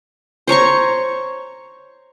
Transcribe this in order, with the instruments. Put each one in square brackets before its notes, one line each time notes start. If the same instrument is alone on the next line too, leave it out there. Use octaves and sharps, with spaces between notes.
[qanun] C5 C#5 A#5 C#6